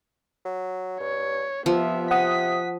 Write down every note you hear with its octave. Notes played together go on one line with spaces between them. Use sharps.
F#3
G2 C#5
C3 F3 B3 E5
C3 F#5 D#6 B6